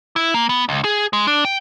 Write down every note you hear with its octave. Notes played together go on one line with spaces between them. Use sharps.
E4
A#3
B3
C#2
G#4
G#3
D4
G5